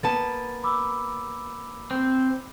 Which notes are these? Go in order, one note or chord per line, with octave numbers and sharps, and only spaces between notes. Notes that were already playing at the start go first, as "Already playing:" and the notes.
A#3 B3 A5 A6
B5 D6 E6
C4